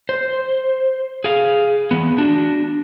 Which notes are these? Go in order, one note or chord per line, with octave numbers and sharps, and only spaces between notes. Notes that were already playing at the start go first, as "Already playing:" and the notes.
C5
G#4 F5
E3 B3
D4 F#4